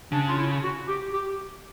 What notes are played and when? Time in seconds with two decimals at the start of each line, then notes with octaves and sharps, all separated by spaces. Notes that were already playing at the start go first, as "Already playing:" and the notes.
0.12 C#3 D4
0.26 F4
0.37 E4
0.62 F#4
0.87 G4
1.11 G4